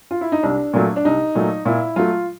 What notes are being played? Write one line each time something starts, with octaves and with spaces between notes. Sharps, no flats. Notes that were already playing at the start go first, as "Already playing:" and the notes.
F4
E4
D#4
C2 D4
A#2 F#3 A3
D4
C2 D#4
A#2 F#3 A3
A#2 E4
F#3 A3 F4